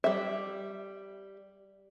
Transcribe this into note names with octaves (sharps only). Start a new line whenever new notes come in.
G3 E5